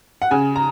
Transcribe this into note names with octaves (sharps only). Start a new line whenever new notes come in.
F#5
C#3 G#5
A#5